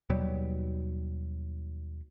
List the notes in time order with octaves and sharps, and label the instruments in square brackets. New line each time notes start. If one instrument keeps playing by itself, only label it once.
[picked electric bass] D#2 B2 F#3 G3